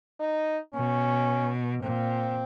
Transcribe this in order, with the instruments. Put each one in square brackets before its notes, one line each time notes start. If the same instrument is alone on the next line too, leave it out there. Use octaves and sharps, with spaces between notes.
[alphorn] D#4
[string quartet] B2 [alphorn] C#4
[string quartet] A#2 [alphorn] C4